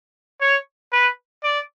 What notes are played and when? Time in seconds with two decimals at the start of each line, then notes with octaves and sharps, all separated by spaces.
0.41 C#5
0.93 B4
1.43 D5